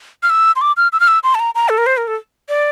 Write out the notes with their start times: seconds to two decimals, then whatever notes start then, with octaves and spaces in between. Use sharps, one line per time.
0.23 F6
0.30 E6
0.56 C6
0.61 D6
0.77 F6
0.93 E6
1.00 F6
1.08 E6
1.23 C6
1.35 A5
1.40 A#5
1.55 A#5
1.69 A4
1.78 A#4
1.86 C5
1.97 A#4
2.08 A4
2.49 D5